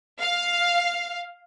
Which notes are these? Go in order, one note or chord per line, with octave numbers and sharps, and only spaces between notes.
F5